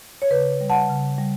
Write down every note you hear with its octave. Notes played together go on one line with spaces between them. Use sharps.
C#5
C#3 B4
G3
F#5 A5
C#3
G3